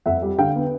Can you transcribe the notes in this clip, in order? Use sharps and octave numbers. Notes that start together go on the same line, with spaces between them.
F2 E5 F#5
G3
D3 F5 G5
B3